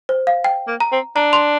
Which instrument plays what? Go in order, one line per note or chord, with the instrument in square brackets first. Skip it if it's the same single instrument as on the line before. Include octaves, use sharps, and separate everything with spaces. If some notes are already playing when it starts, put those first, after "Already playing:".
[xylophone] C5
F5
G5
[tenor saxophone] A#3
[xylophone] A#5
[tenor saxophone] C4
[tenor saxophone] D4 [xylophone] A#5
[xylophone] C6